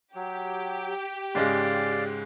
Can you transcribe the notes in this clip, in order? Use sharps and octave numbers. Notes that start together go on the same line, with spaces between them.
F#3 G4
G#2 C#3 G#3 D5 F5